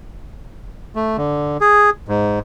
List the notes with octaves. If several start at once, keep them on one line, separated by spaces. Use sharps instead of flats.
A3
D3
G#4
G#2